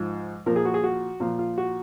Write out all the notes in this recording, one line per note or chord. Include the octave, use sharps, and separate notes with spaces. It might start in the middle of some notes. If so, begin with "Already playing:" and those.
Already playing: G#2 F3
A#2 F3 A#4
G#4
F#4
G#4
F#4
A#2 F3 F4
F4
F#4